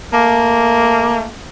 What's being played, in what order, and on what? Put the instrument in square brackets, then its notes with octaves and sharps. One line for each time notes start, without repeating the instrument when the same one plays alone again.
[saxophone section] A3 A#3